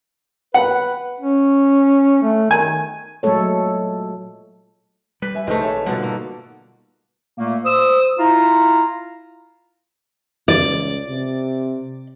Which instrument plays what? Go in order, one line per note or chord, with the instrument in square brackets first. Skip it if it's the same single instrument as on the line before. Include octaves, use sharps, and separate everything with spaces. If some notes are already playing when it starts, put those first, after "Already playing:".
[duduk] B4 [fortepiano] F#5
[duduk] C#4
A3
[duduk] D#3 [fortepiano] G#5
[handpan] A#2 F#3 G#3 A3 A4 C#5
[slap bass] G3 [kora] B4
[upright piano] E5 G#5
[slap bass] A#1 [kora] C3 D#3 A3 [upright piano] D#4 B4 C5
[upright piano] C#5 E5 G#5
[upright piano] G#2 B2 F4 [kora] D3 F#5 [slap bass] G3
[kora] A#3 A4
[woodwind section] A#2 A3 A#3
C5 D#6 E6
E4 F4 F5 A#5
[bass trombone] C#2 [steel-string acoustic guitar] D5
[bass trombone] C3